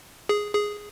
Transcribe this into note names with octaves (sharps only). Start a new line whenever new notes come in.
G#4
G#4